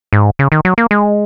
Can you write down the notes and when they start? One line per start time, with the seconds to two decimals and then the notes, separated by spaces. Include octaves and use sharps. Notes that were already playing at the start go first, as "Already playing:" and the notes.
0.13 G#2
0.39 C#3
0.52 D#3
0.65 F#3
0.78 A#3
0.91 G#3